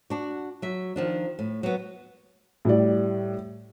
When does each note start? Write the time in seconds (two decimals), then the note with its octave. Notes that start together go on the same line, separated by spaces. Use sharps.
0.10 D4 F#4
0.62 F#3 E5
0.96 D#3 F3 D4
1.39 A2
1.63 F#3 B3
2.65 A2 G3 D5